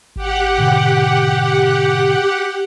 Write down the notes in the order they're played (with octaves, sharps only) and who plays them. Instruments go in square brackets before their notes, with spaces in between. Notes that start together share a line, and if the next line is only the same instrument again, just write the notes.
[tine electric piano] G#1 [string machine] G4 F#5
[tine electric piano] G#2 B2 D3